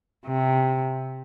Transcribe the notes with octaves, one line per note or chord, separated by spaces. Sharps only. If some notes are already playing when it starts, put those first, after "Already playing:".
C3